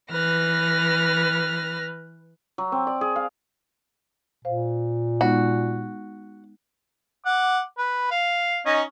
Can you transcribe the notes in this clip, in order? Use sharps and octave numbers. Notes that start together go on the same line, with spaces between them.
E3 B4 F6 A#6
F#3
C4
D5
G#4
F5
A#2 C5 F5
G#3 B3 D#4 F#4
F#5 D6
B4
F5
C#4 D#4 D#5